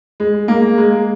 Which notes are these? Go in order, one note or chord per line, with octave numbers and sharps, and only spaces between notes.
G#3
A#3
G#3